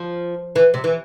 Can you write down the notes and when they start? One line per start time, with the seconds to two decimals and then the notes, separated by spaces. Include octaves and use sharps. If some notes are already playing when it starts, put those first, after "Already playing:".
Already playing: F3
0.56 E3
0.74 C3
0.84 E3